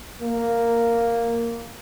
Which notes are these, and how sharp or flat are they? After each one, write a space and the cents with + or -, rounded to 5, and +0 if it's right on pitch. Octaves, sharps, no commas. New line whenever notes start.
A#3 -5